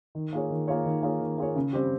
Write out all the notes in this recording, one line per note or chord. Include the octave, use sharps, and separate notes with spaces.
D#3
A#3 F4 G#4 C#5
D#3
A#3 F4 G#4 C#5
D#3
A#3 F4 G#4 C#5
D#3
A#3 F4 G#4 C#5
C#3
G3 C4 G4